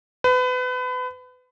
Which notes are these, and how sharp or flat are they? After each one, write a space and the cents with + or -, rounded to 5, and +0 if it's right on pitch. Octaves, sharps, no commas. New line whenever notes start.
B4 +30